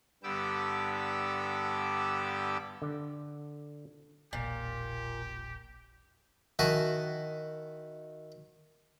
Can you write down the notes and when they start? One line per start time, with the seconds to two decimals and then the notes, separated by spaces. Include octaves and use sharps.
0.23 G2 D3 B3 G4 D6 E6
2.82 D3
4.33 E1 A#1 A#2 G4
6.59 D#3 E4 F#4 G#5 A5